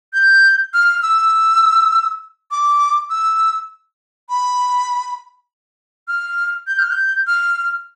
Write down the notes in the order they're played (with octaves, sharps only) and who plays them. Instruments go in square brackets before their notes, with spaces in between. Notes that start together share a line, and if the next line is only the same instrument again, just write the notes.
[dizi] G6
F6
E6
D6
E6
B5
F6
G6
F6
G6
F6